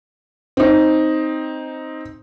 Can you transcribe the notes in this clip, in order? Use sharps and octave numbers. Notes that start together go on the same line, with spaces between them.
C4 D#4